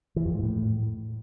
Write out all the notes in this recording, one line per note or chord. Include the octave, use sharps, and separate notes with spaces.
E3
F2
G#2
A2